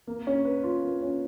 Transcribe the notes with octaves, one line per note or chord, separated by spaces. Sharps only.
A#3
C#4
B4
F4
A#3
C#4